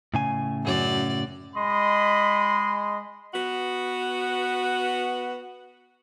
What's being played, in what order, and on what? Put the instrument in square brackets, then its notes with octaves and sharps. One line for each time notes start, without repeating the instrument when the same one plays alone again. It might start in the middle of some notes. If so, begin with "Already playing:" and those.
[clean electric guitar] A2 C#3 G#5
[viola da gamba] F#2 D5
[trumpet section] G#3 D#5 B5 C6
[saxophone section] B3 F#4